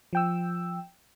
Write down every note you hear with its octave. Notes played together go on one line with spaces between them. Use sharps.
F3 G5 E6